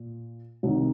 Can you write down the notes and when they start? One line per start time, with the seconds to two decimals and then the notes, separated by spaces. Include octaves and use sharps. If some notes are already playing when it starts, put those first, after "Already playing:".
Already playing: A#2
0.63 C2 C3 D#3